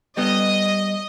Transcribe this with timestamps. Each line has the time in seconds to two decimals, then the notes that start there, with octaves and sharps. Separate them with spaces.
0.17 G3 B3 D#5